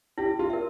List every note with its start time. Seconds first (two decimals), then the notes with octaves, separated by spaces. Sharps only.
0.18 E4 G4
0.39 F4
0.50 A#4 E5